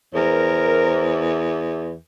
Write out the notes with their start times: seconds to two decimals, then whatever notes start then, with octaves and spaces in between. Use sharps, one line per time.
0.14 E2 A#4 C5